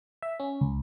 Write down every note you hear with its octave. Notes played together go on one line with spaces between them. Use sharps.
E5
C#4
C#2